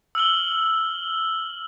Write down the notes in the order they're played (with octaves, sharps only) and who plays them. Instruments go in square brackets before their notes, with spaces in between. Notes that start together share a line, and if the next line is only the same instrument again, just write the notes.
[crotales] E6 F6 F#7 G7